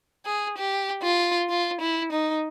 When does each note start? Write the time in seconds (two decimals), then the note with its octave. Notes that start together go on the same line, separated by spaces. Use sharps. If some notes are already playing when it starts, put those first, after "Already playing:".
0.26 G#4
0.57 G4
1.03 F4
1.49 F4
1.81 E4
2.12 D#4